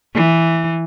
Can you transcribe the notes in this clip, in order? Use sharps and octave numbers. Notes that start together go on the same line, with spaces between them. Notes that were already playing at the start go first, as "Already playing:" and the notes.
E3